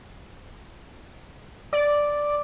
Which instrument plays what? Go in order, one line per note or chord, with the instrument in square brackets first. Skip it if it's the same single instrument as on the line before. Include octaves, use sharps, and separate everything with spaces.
[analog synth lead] D5